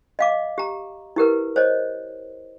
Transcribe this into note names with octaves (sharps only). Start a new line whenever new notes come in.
D#5 F5 D6
G4 A#5
E4 G4 A#4 B4
C5 C#5 D#5